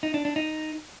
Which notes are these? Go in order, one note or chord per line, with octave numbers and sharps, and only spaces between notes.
D#4
D4
D4
D#4